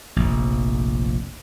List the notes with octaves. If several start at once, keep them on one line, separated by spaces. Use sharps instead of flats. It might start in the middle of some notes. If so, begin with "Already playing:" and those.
F1 A#1